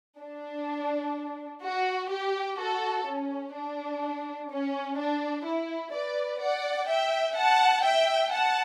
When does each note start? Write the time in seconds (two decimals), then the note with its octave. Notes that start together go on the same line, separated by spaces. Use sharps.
0.20 D4
1.63 F#4
2.11 G4
2.59 F#4 A4
3.07 C#4
3.54 D4
4.50 C#4
4.98 D4
5.46 E4
5.93 B4 D5
6.41 D5 F#5
6.89 E5 G5
7.36 F#5 A5
7.84 E5 G5
8.31 F#5 A5